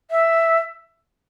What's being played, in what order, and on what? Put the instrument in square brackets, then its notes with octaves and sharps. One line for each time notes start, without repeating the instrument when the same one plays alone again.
[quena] E5